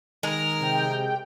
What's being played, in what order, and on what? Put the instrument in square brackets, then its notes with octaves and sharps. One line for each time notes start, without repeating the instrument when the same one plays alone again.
[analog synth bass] D#3 [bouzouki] G#3 [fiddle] A#4 A#5
[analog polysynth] C3 G5